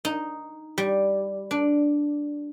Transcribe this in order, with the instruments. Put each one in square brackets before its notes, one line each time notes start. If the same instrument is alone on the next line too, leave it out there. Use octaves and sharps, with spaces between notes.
[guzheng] D#4
G3
D4